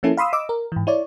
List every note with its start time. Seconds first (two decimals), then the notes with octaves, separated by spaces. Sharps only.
0.03 F3 A#3 C#4 E4 A4
0.17 F5 B5 C6 D#6 E6
0.33 D#5 D6 E6
0.49 A#4
0.72 G#2 E3
0.87 E4 C#5 D5